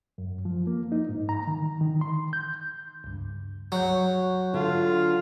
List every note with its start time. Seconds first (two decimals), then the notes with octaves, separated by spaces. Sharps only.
0.18 F#2
0.45 F3
0.67 A#3
0.92 D#4
1.09 G#2
1.29 A#5
1.47 D#3
1.81 D#3
2.01 C6
2.33 G6
3.04 C#2 G2
3.72 F#3 C#6 F#6 G6
4.54 D3 F4